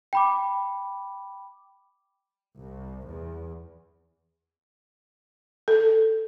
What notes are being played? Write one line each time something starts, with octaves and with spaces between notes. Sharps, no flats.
G5 B5 D6
C2
E2
A4